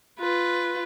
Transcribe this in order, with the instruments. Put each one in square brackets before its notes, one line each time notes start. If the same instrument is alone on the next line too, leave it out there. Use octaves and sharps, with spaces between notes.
[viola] F4 B4